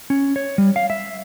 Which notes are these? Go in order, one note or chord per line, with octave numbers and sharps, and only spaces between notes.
C#4
C#5
G3
F5
E5